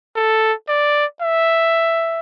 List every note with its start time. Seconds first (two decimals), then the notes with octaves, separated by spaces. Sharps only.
0.16 A4
0.69 D5
1.21 E5